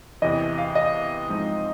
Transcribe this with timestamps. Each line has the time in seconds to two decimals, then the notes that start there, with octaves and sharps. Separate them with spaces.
0.22 E2 C3 E3 D#5
0.58 F5
0.75 D#5
1.29 G#2 F3 G#3 C4 D#4